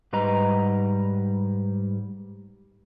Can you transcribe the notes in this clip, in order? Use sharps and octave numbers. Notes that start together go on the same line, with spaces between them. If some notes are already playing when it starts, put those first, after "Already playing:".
G#2 G3 B4 D#5 A#5